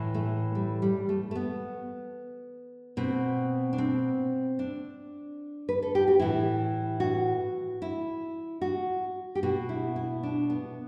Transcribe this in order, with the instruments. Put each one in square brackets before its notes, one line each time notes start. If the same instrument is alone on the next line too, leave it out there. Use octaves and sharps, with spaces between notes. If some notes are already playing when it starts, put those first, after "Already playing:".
Already playing: [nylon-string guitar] A2 E3
A3
G3
G3
A3
A3
B3
B2 C4
D4
C4
D4
B4
A4
G4
F#4
A2 E3 E4
F#4
E4
F#4
G4
B2 F#4
E4
E4
D4
B3